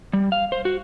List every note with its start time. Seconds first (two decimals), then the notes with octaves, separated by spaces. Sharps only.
0.13 G3
0.32 F5
0.52 C5
0.65 F#4